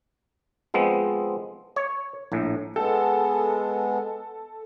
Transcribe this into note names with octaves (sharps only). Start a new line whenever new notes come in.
F3 G#3 B3 C4
C#5
A#1 A2
G#3 B3 A4